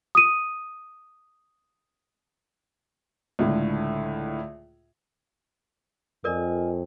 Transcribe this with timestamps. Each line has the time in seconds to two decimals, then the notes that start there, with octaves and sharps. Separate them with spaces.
0.15 D#6 D#7
3.39 C#2 A2 D3
6.24 F2 F4 A4 A#4 D5 D#5 G#5